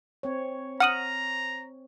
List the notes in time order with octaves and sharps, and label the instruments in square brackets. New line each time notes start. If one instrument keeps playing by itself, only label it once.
[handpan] C4 C#5
[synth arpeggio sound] F#5 D#6 [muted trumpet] A#5 [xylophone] F6 D#7 F#7